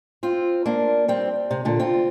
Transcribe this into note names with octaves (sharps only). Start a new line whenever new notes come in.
C4 F4
A#3 D4
G3 C4
C3
A#2 D3
C4 F4